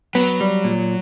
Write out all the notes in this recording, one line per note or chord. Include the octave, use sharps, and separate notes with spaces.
F#3 B3
G3
A#2